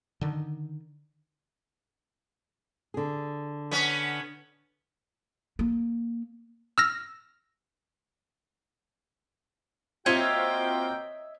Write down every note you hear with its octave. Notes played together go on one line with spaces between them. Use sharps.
D3 D#3
D3 G#4
B3 C#4
A#3
E6 F6 A#6
A#3 C4 F4 F#4 C#5 D#5 E5 G5